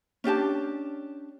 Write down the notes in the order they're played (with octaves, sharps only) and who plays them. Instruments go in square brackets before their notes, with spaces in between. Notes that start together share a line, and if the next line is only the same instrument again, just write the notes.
[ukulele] C#4 D4 G4 A5